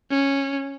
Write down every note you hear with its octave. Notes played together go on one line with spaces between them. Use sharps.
C#4